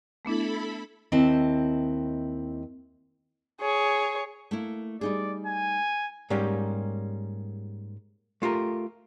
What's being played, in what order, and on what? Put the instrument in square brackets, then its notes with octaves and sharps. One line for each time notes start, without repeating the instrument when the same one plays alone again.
[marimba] A3 B3 D4 [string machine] E4 A4 B5
[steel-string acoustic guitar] D#2 C4 E4 D#5 A5
[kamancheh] G#4 C#5
[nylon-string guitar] A3 A#3 E4
[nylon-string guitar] G3 D#4 G#4 [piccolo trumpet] D5
[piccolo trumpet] G#5
[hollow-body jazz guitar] G#2 G3 A#3 C#4 G4
A3 F4 G4 A#4